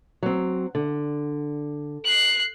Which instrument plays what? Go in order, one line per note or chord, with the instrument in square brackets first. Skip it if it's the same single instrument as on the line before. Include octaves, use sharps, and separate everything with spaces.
[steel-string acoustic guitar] F#3 C4
D3
[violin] F#6 C7